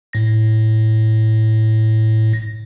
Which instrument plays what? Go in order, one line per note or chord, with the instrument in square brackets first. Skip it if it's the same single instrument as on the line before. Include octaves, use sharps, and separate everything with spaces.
[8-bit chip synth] A2 A#6